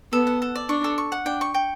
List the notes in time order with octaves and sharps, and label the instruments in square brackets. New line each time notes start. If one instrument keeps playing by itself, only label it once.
[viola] B3 [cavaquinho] A4
[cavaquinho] F#5
A4
D5
[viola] D4 [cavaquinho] C#6
[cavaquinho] A4
C#6
F#5
[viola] D4 [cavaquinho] G5
[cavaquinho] C#6
G5